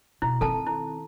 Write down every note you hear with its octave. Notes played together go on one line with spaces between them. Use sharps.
B2 E4
D#3 C4 A4 A5
E4